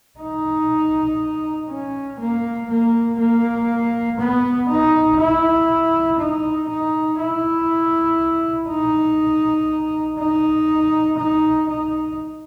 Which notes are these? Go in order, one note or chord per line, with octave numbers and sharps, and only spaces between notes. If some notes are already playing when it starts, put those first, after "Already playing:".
D#4
C#4
A#3
A#3
A#3
B3
D#4
E4
D#4
D#4
E4
D#4
D#4
D#4
D#4